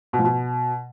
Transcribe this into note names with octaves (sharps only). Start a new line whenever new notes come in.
B2
F3
B2